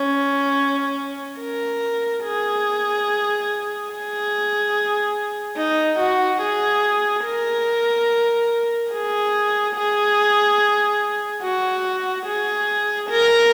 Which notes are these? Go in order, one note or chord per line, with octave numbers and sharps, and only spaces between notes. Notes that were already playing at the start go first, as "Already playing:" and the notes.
Already playing: C#4
A#4
G#4
G#4
D#4
F#4
G#4
A#4
G#4
G#4
F#4
G#4
A#4